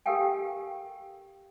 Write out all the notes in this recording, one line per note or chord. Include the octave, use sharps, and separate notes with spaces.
G4 A4 A#4 F5 G5 G#5